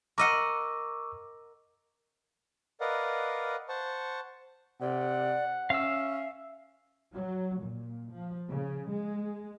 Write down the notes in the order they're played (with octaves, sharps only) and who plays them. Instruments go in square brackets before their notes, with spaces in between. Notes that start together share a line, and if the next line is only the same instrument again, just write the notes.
[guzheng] A#4 D#5 F#5 [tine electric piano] C#6 D6 E6
[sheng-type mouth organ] A#4 B4 D5 D#5 F5 F#5
C5 F#5 A5 C#6
[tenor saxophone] C3 [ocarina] D5 [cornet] F#5
[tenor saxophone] C#4 [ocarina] E5 [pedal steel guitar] F5 E6
[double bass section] F#3
A#2
F3
C#3
G#3